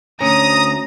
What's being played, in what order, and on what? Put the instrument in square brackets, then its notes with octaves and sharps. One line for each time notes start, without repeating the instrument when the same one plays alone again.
[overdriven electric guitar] D2 [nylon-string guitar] C#4 [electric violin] A#5 [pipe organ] D#6